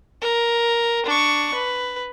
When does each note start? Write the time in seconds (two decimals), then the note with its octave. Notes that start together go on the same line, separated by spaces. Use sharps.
0.22 A#4
1.06 D4 C#6
1.54 B4